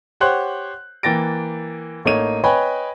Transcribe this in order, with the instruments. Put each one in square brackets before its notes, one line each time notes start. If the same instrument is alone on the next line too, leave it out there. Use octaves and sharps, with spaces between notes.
[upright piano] G4 C5 C#5 F#5 C6 F#6
E3 A#3 G5 A6 A#6 D7
A1 A3 A#3 D#4 C#5 D#7
B4 C#5 D#5 G5 G#5 B5